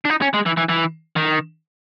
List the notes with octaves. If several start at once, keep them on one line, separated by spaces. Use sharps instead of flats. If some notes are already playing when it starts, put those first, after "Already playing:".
D4
D#4
C#4
G#3
E3
E3
E3
D#3